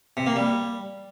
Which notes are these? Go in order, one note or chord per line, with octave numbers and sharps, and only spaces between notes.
C3
A#3
G3